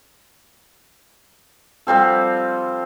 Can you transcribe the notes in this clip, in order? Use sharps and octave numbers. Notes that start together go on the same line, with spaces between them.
F3 G3 C4 A4